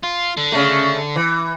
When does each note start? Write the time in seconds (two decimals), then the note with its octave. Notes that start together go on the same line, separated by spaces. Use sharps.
0.03 F4
0.37 D3
0.52 C#3 A3
1.16 E3